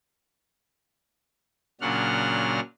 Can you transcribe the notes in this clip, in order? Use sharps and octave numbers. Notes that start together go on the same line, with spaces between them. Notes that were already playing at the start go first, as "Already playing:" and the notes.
A#2 C#3 F#3 D4 F#5 F6